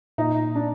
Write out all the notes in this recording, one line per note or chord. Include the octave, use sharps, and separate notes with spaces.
A#2 D#4
D4